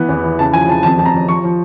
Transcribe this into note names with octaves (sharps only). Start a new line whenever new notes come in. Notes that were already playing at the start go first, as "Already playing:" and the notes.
Already playing: E3 B3
E2
E3
C#3 A5
F3 G#5
C#3 A5
F2 A5
F2 A5
A#5
F2
F3 C#6
F3